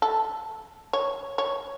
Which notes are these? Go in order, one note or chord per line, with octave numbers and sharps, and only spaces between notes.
A4
C#5
C#5